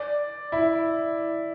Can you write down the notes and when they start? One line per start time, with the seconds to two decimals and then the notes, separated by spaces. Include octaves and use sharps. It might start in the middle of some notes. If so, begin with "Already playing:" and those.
Already playing: D5
0.52 E4